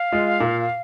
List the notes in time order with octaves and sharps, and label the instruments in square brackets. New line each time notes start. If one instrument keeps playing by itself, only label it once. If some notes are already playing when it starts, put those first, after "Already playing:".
Already playing: [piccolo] F5
[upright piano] G#3 F4
A#2